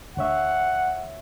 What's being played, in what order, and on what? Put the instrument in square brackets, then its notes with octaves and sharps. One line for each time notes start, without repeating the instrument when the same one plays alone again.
[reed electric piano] D2 C#5 E5 [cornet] F#5